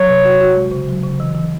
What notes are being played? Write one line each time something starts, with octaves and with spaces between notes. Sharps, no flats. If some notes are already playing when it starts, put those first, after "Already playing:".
Already playing: F#3 C#5
C3
F#4
F#4
G#3
C#3
F#3
C#3
E3
E3